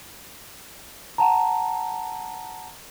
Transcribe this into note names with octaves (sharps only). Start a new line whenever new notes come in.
F#5 A5 A#5